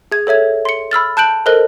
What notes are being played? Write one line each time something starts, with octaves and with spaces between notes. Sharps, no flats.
G#4 G#6
A4 C#5 E5 G#6
C6 C#7
B5 E6 F6 A6
A5 F#6 G6 D7 F#7
A4 A#4 C5 D#5 F#6 G7